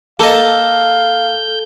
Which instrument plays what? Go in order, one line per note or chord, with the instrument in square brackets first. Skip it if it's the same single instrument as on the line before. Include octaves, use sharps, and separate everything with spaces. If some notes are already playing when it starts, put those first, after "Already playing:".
[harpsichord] A#3 D#5 [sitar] A4 [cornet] F5 [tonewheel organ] G6